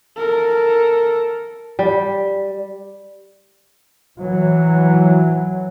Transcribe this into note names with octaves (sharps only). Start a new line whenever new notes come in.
A4 A#4
G3
E3 F#3